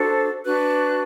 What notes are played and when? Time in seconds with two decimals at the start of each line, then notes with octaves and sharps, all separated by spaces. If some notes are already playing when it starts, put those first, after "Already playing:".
Already playing: D4 F#4 A4 C5
0.44 D4 F#4 B4 F#6